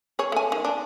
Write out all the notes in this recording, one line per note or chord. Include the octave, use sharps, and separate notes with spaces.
G#4 C#5
A3 G#5
D#3
D4